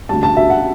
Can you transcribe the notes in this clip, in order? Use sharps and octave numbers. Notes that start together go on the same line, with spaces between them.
D2 D3 G3 A5
A5
E5
F#5